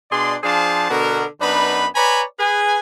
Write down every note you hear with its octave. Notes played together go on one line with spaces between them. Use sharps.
B2 D4 G#4 D5 C6
F3 D4 G#4 C5 F5 A5
B2 D3 B3 F#4 A#4
F#2 B3 D4 D#4 B4 B5
B4 C#5 D5 G#5 A#5 B5
G#4 B4 G#5